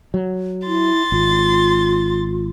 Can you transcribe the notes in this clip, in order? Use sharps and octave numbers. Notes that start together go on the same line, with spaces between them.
F#3
E4 C6 A6
G#1 F4